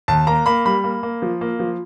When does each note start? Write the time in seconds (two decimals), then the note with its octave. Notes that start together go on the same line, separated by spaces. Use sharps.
0.08 D#2 A5
0.27 A#3 A#5
0.46 A#3 B5
0.65 G3 B5
0.84 A#3
1.03 A#3
1.22 F3
1.41 A#3
1.59 F3